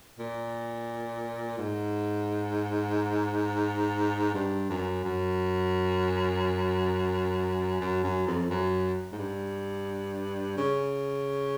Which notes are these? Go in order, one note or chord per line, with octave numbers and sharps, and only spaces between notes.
A#2
G#2
G2
F#2
F#2
F#2
F#2
F2
F#2
G#2
G2
C#3